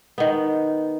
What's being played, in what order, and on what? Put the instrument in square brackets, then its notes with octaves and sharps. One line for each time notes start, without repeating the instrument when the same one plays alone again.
[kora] D#3 B3